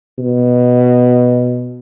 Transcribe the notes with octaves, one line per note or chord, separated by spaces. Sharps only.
B2